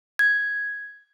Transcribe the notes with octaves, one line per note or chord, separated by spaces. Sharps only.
G#6